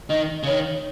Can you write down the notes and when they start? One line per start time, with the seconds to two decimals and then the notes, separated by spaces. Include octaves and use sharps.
0.09 D#3 D#5
0.43 C#3
0.47 D#3 C#5